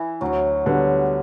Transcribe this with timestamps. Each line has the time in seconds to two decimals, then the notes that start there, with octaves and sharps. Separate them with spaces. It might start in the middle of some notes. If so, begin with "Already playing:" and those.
Already playing: E3
0.21 D2 F#3
0.66 D3 F#3 G3 B3